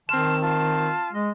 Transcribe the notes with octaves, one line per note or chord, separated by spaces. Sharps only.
D#3 C4 A5 C6 F6 E7
F4 A5
G#3 D#5